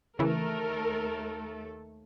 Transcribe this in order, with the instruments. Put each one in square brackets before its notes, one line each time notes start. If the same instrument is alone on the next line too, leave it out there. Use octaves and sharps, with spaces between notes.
[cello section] D#2 A3 A4 [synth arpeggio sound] C#3 E3 [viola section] A#4